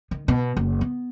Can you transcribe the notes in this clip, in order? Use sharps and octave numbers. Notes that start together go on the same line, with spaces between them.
D#3
B2
F#1
B3